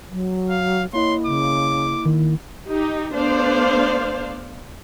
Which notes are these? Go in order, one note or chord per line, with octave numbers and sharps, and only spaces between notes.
F#3
F5
A#3 E4 C#5 D#5 C6
C#3 D6
D#3
D#4 G4
A3 B3 D4 C5 D5 F5